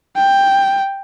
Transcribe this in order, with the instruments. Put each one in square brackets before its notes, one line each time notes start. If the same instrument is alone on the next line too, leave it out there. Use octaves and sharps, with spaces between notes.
[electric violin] G5